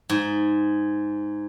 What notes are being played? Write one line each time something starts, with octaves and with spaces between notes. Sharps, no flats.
G#2